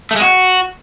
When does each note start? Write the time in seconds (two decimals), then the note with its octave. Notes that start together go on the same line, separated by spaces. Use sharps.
0.11 A3
0.16 G#3
0.21 F#4